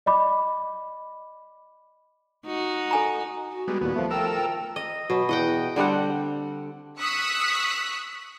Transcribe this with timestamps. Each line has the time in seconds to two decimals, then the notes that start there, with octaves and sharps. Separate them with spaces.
0.06 D5 D#5 B5 D6
2.46 D#4 F#4
2.91 A4 G#5 A#5
3.51 F#4
3.68 G3 G#3 B3
3.81 D#2 A#2 B3
3.96 F3 A3
4.11 A4 A#4 G5 E6
4.35 G5
4.76 D#5
5.10 B2 F#3
5.29 E2 D#5 F#5 G5
5.76 D3 G3 C4 F#5
6.99 C#6 D#6 E6 F#6 B6 C#7